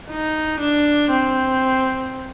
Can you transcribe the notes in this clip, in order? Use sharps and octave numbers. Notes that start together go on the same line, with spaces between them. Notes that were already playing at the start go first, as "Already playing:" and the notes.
D#4
D4
C4